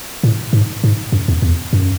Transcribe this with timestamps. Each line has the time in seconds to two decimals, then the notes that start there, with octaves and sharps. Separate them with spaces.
0.23 A2
0.53 G#2
0.84 G#2
1.12 F#2
1.28 E2
1.42 E2
1.73 F#2